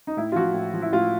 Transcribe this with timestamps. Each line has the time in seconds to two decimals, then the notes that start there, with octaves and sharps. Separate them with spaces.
0.07 D#4
0.17 A2 E4
0.32 F4
0.35 F3 F#4
0.54 A2
0.73 F3
0.82 E4
0.93 A2 F4